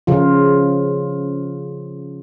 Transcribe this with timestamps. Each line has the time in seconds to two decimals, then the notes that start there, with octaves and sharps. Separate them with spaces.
0.07 C#3 F3 F4